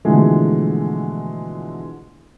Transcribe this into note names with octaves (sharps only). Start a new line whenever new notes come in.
B2 D3 E3 F3 G#3 A3